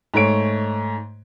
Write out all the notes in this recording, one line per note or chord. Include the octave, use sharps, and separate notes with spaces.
G#2 A3 C#5 D7